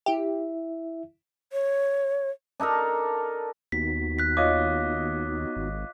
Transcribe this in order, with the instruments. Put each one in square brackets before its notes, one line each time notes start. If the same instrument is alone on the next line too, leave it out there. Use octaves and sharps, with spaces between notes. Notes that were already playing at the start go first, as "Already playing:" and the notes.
[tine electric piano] E4 E5 [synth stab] G4
[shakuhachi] C#5
[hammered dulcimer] D4 D#4 A4 A#4
[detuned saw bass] D#2 [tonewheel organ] B3 D#4 F#4 [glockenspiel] B6
[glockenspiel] F#6 B6
[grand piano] F4 C#5 D#5 [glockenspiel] D6
[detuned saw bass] G#1